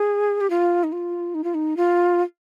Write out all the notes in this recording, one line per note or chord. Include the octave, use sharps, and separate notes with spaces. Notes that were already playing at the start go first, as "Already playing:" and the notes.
Already playing: G#4
G4
F4
D#4
F4
D#4
F4
D#4
F4